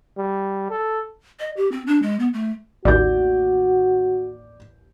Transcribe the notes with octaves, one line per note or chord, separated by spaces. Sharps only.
G3
A4
D#5
G4
C4
D4
G#3
B3
A3
A1 D#2 F#4 D5 G6